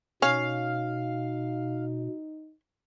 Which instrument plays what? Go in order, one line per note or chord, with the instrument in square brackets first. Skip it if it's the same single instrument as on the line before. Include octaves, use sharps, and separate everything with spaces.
[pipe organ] B2 [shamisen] C#4 [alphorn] D#4 [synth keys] F5